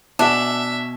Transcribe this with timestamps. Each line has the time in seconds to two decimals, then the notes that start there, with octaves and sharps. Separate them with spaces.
0.19 B2 D4 F#4 E5 G#5